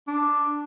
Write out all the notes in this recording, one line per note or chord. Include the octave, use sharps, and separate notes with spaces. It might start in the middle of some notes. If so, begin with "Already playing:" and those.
D4